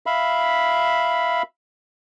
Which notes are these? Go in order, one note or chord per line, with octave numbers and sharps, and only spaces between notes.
E5 F5 B5